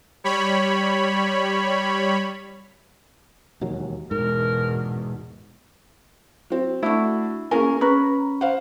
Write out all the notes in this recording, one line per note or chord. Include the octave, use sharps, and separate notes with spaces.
G3 C#5 B5
E1 D#2 F#3
E2 G#2 B2 A#4
F#3 C4
A3 D4 E4 F#4
A#3 C#4 G#4 A#4 G#5
C#4 B4 A#5
C5 F5 F#5